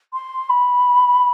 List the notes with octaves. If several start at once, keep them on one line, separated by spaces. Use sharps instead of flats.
C6
B5